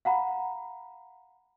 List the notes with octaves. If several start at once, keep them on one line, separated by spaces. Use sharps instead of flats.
F5 F#5 A#5 B5